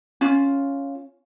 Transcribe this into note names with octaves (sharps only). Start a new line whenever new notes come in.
C#4 F4